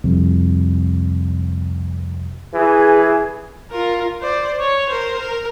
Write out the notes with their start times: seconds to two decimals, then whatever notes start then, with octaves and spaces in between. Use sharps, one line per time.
0.04 C2 F2
2.54 E3 G#4
3.71 F4 A#4
4.21 C5 D5
4.60 C#5
4.89 A#4 C5
5.19 A#4